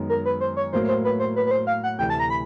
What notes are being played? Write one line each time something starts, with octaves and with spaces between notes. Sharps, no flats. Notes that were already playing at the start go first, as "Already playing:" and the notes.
Already playing: F#2 D#3 G#3 B3 D#4
A#4
B4
C5
C#5
A2 F#3 A#3 C5
C5
B4
C5
B4
B4
C5
F5
F#5
D2 C3 E3 A3 G5
A5
A#5
B5